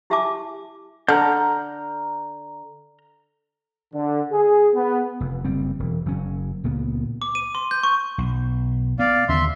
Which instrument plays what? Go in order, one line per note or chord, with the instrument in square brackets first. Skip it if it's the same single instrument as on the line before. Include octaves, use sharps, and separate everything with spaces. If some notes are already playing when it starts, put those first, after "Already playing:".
[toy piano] E4 G4 E5 G#5 A5 D6
[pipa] D3 [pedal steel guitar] A#5 F6 G6
[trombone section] D3
G#4
B3
[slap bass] F1
F#1 G3 C4
E1
F#1 F#3 C#4
C#2 A#2 B3
[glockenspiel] D6
D#7
C6
G6
C#6
[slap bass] B1
[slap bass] B3 [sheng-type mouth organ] D5 F5
[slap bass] D#2 D3 C#4 [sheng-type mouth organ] E5 C6